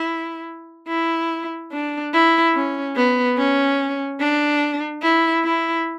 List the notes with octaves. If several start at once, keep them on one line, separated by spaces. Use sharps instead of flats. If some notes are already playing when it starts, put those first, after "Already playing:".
Already playing: E4
E4
D4
E4
C#4
B3
C#4
D4
E4
E4